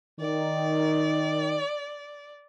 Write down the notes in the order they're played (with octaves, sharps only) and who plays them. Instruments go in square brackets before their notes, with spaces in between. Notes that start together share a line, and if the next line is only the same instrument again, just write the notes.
[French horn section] D#3 [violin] D5